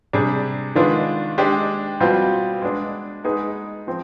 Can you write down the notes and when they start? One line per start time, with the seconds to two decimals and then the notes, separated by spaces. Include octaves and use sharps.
0.13 C3 G3 D4 G#4
0.75 D#3 G#3 B3 D4 F4
1.38 G#3 D4 G4
2.00 B2 G3 C4 F4
2.62 G#3 B3 D4
3.24 G#3 B3 D#4 G#4
3.87 F3 C4